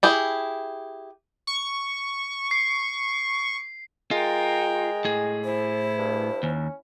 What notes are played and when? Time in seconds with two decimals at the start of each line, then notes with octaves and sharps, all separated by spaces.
0.03 E4 G4 G#4
1.47 C#6
2.51 C7
4.11 G#3 F4 A#4 G5
5.05 A2 G#4
5.45 E4 C5
5.98 G2
6.43 D#2 C#4